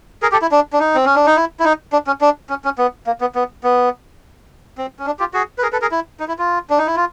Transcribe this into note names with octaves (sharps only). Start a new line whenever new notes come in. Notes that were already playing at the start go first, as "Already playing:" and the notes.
G#4 A#4
G4 A4
E4
D4
D4
D#4
C4
C#4
D4
D#4
E4
E4
D#4
D4
C#4
D4
C#4
C#4
B3
A#3
B3
B3
B3
C4
C#4
D4
F4 G4
F#4 G#4
B4
G#4 A#4
A4 B4
G#4 A#4
E4
D#4
E4
F4
D4
D#4
E4
F4